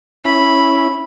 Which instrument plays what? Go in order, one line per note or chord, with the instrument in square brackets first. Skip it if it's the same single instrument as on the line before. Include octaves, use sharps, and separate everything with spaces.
[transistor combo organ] C#4 E4 [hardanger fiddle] B5